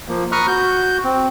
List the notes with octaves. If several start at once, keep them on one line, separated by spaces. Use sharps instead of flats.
F3 A#3
A#5 B5 C#6 D#6 F6 F#6
F#4 G6
C4